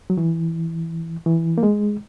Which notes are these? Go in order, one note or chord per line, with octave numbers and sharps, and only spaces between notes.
F#3
E3
E3
A#3
G#3